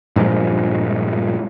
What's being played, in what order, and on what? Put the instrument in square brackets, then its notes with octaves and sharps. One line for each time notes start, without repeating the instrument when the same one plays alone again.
[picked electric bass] G2 A#2 F3 G#3